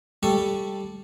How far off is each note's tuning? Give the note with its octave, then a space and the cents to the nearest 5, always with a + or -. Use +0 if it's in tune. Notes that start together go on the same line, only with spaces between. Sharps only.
G3 +0 A4 +0 C#6 +0